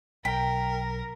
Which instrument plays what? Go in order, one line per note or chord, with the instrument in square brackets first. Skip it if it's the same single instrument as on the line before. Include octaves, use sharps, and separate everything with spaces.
[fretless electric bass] B1 [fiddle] A#4 [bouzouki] G5 [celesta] B6